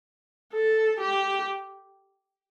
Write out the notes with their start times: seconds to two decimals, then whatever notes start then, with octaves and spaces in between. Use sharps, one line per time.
0.54 A4
1.00 G4